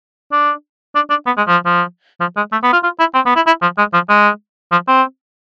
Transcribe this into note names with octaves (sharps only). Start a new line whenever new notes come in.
D4
D4
D4
B3
G#3
F3
F3
F3
G#3
A3
B3
F4
F4
E4
C4
B3
E4
E4
F3
G#3
F3
G#3
F3
C4